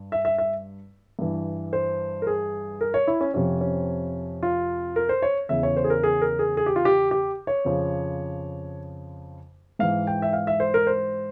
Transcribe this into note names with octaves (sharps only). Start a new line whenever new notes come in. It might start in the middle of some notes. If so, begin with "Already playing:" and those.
Already playing: G2
E5
E5
E5
G2 E3
C5
A#4
G#4
A#4
C#5
E4
C#4
F2 C3 F3 C#4
C#4
F4
A#4
C5
C#5
E2 C#3 E3 E5
C#5
C5
G#4
A#4
G#4
A#4
G#4
G#4
G4
F4
G4
G4
C#5
F2 C#3 F3
G#2 E3 F5
G5
E5
F5
E5
C5
A#4
C5